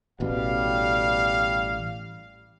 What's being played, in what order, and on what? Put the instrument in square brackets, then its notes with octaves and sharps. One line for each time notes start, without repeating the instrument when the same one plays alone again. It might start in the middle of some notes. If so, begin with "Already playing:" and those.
[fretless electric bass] A1 B2 [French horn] G3 [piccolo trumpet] F5